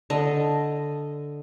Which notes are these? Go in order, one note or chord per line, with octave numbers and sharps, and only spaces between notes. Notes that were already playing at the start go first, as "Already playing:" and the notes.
D3 D#5